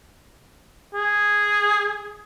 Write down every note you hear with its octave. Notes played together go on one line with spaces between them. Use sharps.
G#4